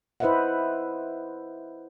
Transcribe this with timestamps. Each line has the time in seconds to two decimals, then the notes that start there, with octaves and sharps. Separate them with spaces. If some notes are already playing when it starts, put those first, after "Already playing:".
0.20 E4 B4 C5 D#5 E5 F#5